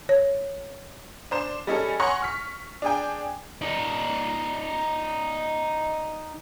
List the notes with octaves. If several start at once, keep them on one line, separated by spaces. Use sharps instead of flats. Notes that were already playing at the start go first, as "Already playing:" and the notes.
C#5
D4 C5 E7
G3 C#4 D#4 G#4 A4
C#5 F#5 G#5 C6 C#6 A#6
C#6 F6 B6
D4 G#4 G5
D#4 D5